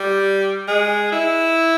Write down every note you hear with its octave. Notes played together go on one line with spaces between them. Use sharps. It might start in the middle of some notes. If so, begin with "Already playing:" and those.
Already playing: G3
G#3
E4